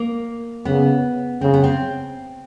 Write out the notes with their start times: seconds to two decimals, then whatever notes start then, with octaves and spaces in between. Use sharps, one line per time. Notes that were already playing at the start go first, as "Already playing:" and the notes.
Already playing: A#3
0.65 C#3 B3
1.41 C#3 C4
1.54 B3
1.64 C4